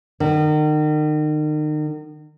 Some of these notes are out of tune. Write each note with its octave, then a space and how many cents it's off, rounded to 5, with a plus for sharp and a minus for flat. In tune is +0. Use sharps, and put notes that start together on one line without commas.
D#3 -35